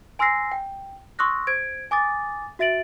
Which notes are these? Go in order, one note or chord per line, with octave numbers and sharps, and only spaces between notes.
G#5 C6 E6 F6 A#6 C7
G5
C6 C#6 D#6 E6 F#6 A#6
C5 G#6 D7
G#5 D6 D#6 A6
F#4 E5 A6 D7 F#7